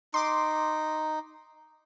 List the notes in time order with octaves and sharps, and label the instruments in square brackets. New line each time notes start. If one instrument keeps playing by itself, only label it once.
[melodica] D#4 [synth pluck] C6 D6